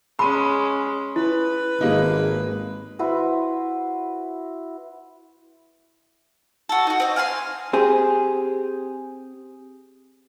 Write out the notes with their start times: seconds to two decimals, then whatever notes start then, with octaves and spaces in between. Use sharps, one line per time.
0.19 G#3 C#4 B5 C6 D#7
1.16 E4 B4
1.81 G#1 G#3 A#3 D#4
2.99 E4 F#4 B4 C5
6.69 F#4 A4
6.87 D#4 F#4
7.00 C4 D#5
7.16 F5 G#5 A5 C6
7.73 C4 G4 G#4